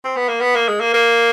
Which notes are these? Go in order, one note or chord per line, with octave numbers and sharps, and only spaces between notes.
C4
B3
A#3
B3
A#3
G#3
A#3
A#3